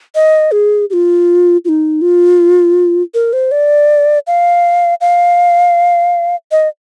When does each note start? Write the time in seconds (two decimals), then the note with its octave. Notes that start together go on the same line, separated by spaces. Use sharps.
0.15 D#5
0.52 G#4
0.90 G4
0.93 F4
1.65 F4
1.69 D#4
2.02 F4
3.14 A#4
3.33 C5
3.51 D5
4.27 F5
5.01 F5
6.51 D#5